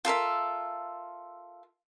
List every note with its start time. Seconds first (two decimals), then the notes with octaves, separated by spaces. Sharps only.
0.05 F4 A4 A#4 E5